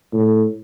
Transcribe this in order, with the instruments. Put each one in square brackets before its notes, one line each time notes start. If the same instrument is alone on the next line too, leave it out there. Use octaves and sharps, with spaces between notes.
[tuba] A2